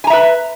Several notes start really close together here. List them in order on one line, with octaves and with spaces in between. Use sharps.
G#5 A#5 E5 B4